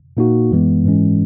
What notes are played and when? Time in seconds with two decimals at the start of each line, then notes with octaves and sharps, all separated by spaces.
0.17 A#2 A#3 D#4 F#4
0.51 F#2 E3 G#3 B3
0.84 G#2 E3 G#3 C#4